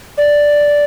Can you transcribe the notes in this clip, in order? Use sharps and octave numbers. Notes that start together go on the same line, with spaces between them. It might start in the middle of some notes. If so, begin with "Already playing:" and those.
D5